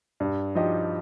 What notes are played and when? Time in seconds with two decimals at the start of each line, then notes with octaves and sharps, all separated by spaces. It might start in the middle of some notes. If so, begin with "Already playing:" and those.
0.20 G2
0.55 F3 D#4 G4 D#5